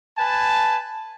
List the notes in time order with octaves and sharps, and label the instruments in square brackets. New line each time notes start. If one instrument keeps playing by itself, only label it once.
[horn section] B4 G#5 A5